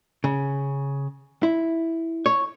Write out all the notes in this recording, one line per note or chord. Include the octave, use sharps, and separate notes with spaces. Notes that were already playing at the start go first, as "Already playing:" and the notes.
C#3
E4
C#5